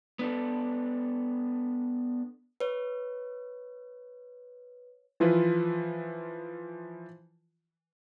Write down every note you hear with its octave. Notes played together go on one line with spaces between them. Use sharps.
B3 D4 A4
B4 C#5
E3 F3 E4 F4 B4